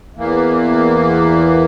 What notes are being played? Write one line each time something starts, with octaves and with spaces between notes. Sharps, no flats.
E2 E3 A#3